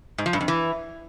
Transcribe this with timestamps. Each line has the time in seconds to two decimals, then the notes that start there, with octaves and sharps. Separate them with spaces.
0.18 G#2
0.26 F3
0.33 G2
0.41 F2
0.48 E3